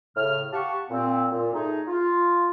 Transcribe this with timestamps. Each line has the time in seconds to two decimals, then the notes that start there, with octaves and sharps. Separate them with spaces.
0.17 A2 C#3 F6
0.53 G4 F5 F#5 A5 C#6
0.91 A#2 C4
1.32 A#2
1.53 A3 D#4 G#4
1.87 F4